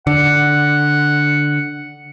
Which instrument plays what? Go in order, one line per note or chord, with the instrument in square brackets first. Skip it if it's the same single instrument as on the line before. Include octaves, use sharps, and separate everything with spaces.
[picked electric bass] D3 [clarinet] F#5